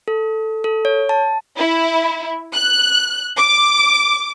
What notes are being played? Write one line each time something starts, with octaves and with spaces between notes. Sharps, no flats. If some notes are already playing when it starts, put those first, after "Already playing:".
A4
A4
C#5
A5
E4
F#6
D6